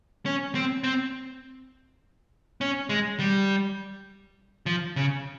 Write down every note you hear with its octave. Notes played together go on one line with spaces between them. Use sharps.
C#4
C4
C4
C#4
G#3
G3
F3
C#3